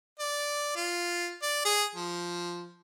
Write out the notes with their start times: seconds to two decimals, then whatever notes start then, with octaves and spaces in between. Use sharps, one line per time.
0.19 D5
0.76 F4
1.42 D5
1.65 G#4
1.95 F3